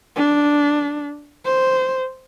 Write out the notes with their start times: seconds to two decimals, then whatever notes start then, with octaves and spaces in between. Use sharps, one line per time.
0.16 D4
1.45 C5